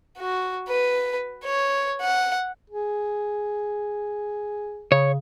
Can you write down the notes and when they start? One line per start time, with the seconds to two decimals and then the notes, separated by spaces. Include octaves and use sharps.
0.18 F#4
0.68 B4
1.45 C#5
2.01 F#5
2.70 G#4
4.92 C#3 C#5